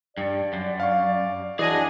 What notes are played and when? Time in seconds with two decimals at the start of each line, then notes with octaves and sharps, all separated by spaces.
0.18 G2 D5
0.53 F#2
0.80 F5 C#6
1.59 E3 F#3 D4 G#4 D#5 G#5